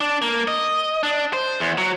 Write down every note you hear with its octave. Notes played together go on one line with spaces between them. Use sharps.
D4
A#3
D#5
D4
C5
E2
F#3